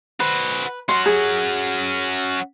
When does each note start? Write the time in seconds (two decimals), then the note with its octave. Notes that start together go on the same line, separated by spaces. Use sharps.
0.20 F#4 B4 C5
0.89 C#4 F#4 C6
1.06 G#4